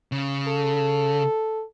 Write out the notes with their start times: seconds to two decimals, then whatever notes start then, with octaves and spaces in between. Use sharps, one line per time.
0.12 C#3
0.48 A4